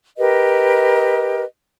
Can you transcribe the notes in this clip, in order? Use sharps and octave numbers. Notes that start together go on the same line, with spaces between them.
G4 A#4 B4 D#5